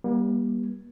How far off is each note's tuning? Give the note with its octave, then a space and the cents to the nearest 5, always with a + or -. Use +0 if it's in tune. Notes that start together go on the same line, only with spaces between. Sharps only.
G3 +10 A#3 +45